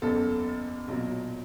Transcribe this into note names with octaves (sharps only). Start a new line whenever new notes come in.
F#1 E2 C#3 A4
B1 A#2 F#3